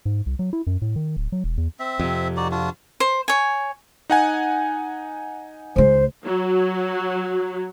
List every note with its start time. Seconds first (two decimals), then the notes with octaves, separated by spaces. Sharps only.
0.05 G#2
0.26 C2
0.39 F#3
0.53 E4
0.67 F#2
0.82 A2
0.96 D#3
1.17 D1
1.32 F#3
1.44 E1
1.57 E2
1.79 C4 E5
1.99 F2 C3
2.37 D#4 F#4 D5
2.51 D4 F4 F#4
3.00 C5
3.28 C#5 G#5
4.10 D#4 F#5 G#5
5.76 C#2 G#3 C5
6.25 F#3